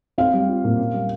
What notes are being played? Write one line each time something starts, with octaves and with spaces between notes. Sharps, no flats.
C4 F5
G3
F4
A#2
C#4
G3